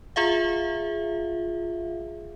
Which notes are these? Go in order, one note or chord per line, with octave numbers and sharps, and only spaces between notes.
F4 G#4 E5 F5